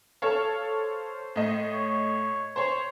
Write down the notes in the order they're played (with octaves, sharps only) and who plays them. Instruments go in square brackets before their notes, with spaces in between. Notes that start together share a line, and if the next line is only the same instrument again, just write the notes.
[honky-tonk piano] A4 C#5 F5
[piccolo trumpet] C5
[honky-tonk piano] A2 D#5
[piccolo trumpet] C#5
[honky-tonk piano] C5 C#5 [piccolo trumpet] C6